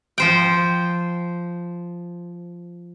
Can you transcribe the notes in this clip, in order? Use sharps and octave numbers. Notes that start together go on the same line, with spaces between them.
F3 C5 G5